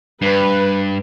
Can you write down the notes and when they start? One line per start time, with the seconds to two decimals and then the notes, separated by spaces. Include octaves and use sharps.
0.22 G2 B4